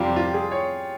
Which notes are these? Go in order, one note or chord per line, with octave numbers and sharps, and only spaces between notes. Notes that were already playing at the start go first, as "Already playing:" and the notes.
Already playing: F2 C3 G3 C4 F4 G4
F4
G#4
C#5